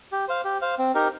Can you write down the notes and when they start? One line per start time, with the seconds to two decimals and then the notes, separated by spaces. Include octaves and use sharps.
0.12 G4
0.28 C5 F5
0.44 G4
0.62 C5 F5
0.79 C4
0.95 D#4 G4 A#4